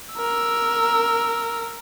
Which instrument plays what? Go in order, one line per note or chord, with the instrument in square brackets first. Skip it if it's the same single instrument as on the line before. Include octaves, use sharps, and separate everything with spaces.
[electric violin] A#4 E6